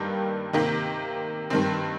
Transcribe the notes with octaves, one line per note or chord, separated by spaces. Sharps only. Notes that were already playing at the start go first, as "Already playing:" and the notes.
Already playing: G2 D#3 G3 A#3 G4
C3 D#3 A#3 G4
G2 D#3 C4